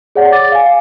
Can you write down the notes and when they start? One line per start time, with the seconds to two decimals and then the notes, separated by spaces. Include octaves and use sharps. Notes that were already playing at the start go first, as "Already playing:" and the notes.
0.15 G#4 C#5 D5 F#5
0.32 D6 A6
0.52 F5 G#5